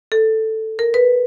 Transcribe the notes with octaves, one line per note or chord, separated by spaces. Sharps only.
A4
A#4
B4